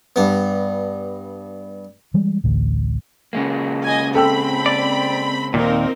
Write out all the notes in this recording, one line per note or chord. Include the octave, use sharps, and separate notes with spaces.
G2 B3
E3 G3 G#3
A1 D2 A2
C#3 G#3 A#3
D#5 G#5
C4 A4 G5 B5 E6
D5
D#2 A#2 C4 D#4 A#4